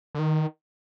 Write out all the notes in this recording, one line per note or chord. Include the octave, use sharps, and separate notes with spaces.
D3
D#3